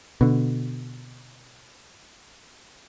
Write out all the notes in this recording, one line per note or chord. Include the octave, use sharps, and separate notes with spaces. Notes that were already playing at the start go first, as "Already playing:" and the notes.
B2 D3